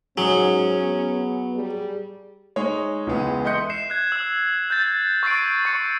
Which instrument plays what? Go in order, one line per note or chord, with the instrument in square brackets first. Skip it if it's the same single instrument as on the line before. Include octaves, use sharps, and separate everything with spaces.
[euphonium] G#2 [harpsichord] F#3 [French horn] C#4 [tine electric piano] G#4
[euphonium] B3
[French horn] G3 [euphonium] G#4
[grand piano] G#3 D#4 C#5
C#2 E3 G#3 B3
D#5 E5 C6 F#6 G6 C#7
[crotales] C7 E7
F#6 G#6
E6
G6 A6
C#6 E6 A6 C7 D7
C#6 C#7